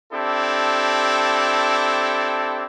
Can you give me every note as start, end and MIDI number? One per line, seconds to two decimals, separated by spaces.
0.12 2.64 60
0.12 2.64 62
0.12 2.64 64
0.12 2.64 67
0.12 2.64 69